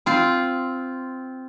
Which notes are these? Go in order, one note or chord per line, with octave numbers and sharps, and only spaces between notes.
C4 F4